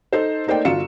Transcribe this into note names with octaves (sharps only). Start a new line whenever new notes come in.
D#4 A4 C5
A3 A#3 D#4 C5 D5 G5
G1 F4 F#4 C#7 E7